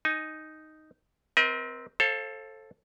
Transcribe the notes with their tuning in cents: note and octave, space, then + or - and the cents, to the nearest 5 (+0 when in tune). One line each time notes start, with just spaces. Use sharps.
D#4 +0 G#5 +15
C4 -5 A#4 +40 D#5 +35
A4 +0 C5 +40 F5 +0